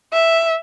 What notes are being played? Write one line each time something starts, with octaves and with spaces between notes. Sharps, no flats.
E5